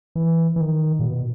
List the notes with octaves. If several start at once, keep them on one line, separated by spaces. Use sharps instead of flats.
E3
E3
D#3
A#2
B2